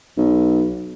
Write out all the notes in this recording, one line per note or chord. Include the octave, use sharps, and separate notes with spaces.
B1